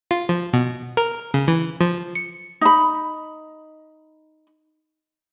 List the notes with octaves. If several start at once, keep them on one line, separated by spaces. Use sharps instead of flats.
F4
F3
B2
A#4
C#3
E3
F3
C#7
D#4 B5